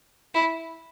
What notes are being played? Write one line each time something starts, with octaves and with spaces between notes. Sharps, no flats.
E4